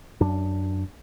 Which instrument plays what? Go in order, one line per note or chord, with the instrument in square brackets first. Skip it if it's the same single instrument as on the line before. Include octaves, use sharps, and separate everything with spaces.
[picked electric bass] F#2 D4